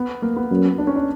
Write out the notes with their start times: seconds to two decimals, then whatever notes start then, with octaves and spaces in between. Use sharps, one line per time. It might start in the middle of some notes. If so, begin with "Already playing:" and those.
Already playing: B3
0.22 A#3
0.36 B3
0.50 F#2
0.78 D4
0.87 C#4
0.96 D4